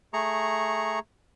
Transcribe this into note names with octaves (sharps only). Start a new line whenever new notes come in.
A3 G#4 A#5 C#6